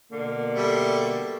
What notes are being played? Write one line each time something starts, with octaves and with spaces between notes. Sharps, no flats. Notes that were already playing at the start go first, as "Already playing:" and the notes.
B2 D3 A#3
G3 A3